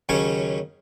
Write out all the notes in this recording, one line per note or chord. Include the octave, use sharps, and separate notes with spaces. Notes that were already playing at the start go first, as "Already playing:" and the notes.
D#2 C#3 F#3 C#4 C#5